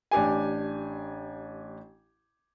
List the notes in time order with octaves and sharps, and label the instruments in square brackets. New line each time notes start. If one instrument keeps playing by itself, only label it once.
[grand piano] A1 D4 G4 G#5